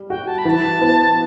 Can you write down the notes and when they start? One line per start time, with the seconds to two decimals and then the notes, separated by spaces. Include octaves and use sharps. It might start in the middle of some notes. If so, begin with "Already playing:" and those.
Already playing: G3
0.09 F#4 G5
0.27 A5
0.38 B5
0.45 E3 A5
0.81 B3